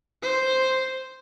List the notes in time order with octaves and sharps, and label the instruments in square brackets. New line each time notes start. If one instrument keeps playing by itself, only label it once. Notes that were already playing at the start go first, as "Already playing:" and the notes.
[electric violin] C5